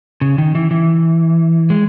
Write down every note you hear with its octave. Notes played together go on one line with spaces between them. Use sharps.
C#3
D#3
E3
E3
G#3